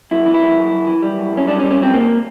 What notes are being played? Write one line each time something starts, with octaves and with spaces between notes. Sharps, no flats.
F#2 E4
E3
E4
F#2
F#2
F#2
E3
G3
F#2
F#2 C#4
G3 D4
C#4
G3
C#4
F#2 C4
C#2 A#3